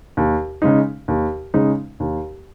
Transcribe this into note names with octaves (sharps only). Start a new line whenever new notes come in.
D#2
C#3 G#3 D#4
D#2
C#3 G#3 D#4
D#2